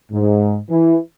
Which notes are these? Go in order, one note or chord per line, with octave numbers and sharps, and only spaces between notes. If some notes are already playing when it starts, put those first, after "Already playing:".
G#2
E3